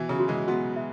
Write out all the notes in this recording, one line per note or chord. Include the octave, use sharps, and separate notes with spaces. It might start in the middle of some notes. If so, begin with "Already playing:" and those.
Already playing: B2 E3 E5
C#3 F#3
F#4
E3 G#3
F#3 B3 F#4
E5